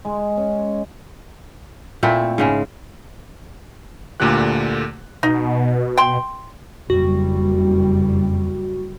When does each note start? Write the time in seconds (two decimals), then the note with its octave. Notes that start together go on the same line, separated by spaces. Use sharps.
0.05 G#3
0.37 C#4
2.03 A#2 A3 C4 E4
2.38 G#2 C#3 G#3
4.20 D2 A#2 D3 A3 G4 F#6
5.23 B2 D#4
5.98 G5 C6
6.90 F#1 F2 G3 F#4